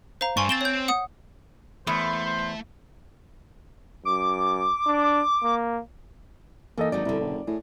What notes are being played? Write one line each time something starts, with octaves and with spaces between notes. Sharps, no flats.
C5 F5 A#5
G2 D4 G#5 C6 C#6
C4 A6 E7 G7
C#5 G6
F#5 D#6
E2 A3 C5
C5
F#2 D6
D4
A#3
E3 A#3 D#4 A4 D#5
G#1 F3 F#3 D#4 D5
C2 B2 D3
F#1
A2 G#4